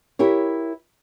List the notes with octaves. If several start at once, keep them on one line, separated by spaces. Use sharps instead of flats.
E4 G4 A#4 C#5